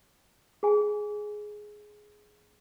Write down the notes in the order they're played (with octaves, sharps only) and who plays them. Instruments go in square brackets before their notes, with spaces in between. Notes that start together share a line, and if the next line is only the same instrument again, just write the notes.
[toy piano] G#4 G#5